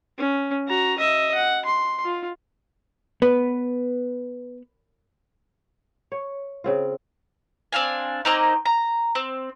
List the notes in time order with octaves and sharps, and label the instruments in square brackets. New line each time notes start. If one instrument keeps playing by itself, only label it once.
[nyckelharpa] C#4
F#4 A#5
D#5 E5
F#5
C6
F4
[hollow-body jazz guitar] B3 [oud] B4
[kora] C#5
C#3 C4 F4
[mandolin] C4 D4 F5 G#5
A#3 C4 D#4
A#5
C4